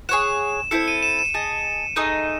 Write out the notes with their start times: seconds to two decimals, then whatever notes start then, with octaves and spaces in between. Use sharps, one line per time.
0.09 G#4 C#5 F#5 E7
0.71 C4 E4 A4 C#7
0.88 D#7
1.02 E7
1.19 E7
1.34 G#4 D#5 A5
1.96 A3 D#4 G#4 D#5